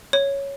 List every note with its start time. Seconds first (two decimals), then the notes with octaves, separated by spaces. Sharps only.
0.13 C#5